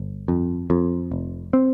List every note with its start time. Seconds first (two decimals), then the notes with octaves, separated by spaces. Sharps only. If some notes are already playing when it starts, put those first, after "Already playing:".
Already playing: G1
0.28 F2
0.70 F2
1.12 F1
1.53 C4